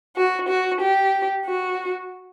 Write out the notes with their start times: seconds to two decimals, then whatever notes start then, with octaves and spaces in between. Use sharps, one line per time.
0.16 F#4
0.49 F#4
0.81 G4
1.45 F#4